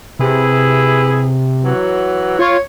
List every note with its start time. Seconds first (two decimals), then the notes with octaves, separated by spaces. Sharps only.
0.19 C3 E4 G#4 B4
1.64 E3 F#3
2.39 F4 C#5